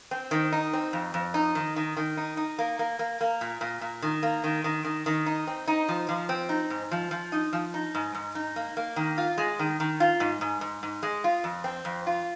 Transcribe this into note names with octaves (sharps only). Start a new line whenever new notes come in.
C4
D#3
D#4
C4
F2
F2
D#4
D#3
D#3
D#3
D#4
D#4
A#3
A#3
A#3
A#3
A#2
A#2
A#2
D#3
A#3
D#3
D#3
D#3
D#3
D#4
C4
D#4
F3
F3
C4
D#4
G#2
F3
F3
D#4
F3
D#4
G#2
G#2
D#4
A#3
A#3
D#3
F4
G#3
D#3
D#3
F4
G#2
G#2
G#2
G#2
G#3
F4
F2
C4
F2
F4